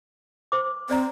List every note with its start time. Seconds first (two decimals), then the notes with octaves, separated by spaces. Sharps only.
0.52 C5 D6
0.89 C4 C5 D5 A#5